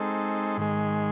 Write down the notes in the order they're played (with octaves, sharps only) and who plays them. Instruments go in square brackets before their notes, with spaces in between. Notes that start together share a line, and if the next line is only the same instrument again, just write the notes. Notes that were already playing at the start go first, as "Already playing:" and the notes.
Already playing: [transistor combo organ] G#3 C4 D#4 A4
G#2 D#3 G#3